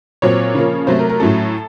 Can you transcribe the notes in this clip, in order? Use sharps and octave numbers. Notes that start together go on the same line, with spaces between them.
A#2 F#3 C4 C#5
C#3 F3 A#3
C3 F#3 A3 C5
A#4
A#4
A2 F#3 A3 C#4 A4